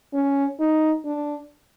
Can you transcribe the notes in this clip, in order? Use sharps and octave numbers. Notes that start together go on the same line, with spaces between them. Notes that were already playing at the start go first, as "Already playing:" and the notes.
C#4
D#4
D4